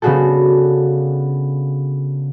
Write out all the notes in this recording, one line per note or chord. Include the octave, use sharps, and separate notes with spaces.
C#3 B3 D4 F#4 G#4 A4